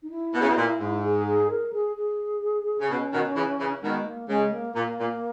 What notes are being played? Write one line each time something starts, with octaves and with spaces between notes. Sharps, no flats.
D#4
E4
B2
C#3
B2
A#2
G#2
G#4
G#4
A#4
G#4
G#4
C#3
B2 C#4
B2 D#3
C#3 E3
C#3 E3
B2 D#3 G#3
A#3
C#3 G#3
A#3
A#2 A#3
A#2